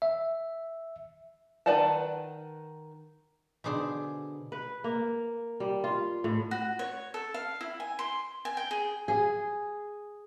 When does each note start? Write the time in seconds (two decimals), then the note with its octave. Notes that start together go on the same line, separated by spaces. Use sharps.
0.02 E5
1.66 D#3 B4 D5 F#5 A5
3.64 B2 D3 D4 G#4 C5
4.52 B4
4.84 A#3
5.60 G3
5.84 F4
6.24 A2
6.51 F#4
6.79 C#5
7.14 A4
7.34 F5
7.61 E4
7.80 G#5
7.99 C6
8.45 G#5
8.57 G5
8.71 G#4
9.08 G#4